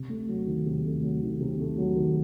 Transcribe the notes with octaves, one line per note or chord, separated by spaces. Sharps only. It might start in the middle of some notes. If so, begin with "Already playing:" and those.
Already playing: C3
A3
F#3
D#3
C3
A3
F#3
D#3
C3
A3
F#3
D#3